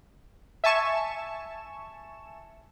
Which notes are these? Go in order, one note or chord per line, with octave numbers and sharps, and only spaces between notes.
E5 G#5 A5 C#6 E7